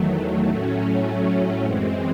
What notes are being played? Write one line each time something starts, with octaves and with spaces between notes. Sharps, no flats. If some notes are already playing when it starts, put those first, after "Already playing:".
Already playing: E2 D#3 F#3 A3
A2 F#3 A3 C#4
F#2 E3 G#3 C4